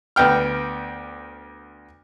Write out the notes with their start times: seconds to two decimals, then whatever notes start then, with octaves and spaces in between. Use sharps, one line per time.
0.16 D2 B3 G5 F6